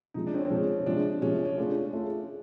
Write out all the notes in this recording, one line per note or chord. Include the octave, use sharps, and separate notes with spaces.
C3 F3 G#3 D#4
D4
C4
C#4
C4
C3 F3 G#3 C#4
C3 F3 G#3 D4
C3 F3 G#3 C#4
C#4
A3 C#4 D4 F4 G#4
A3 C#4 F4 G#4